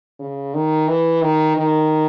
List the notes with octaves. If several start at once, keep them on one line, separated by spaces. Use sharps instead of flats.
C#3
D#3
E3
D#3
D#3